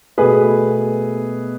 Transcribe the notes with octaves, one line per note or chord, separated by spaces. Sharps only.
B2 A3 G#4 B4